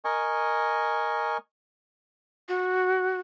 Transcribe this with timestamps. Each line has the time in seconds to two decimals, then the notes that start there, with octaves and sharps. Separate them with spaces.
0.05 A#4 D#5 G#5 C#6
2.49 F#4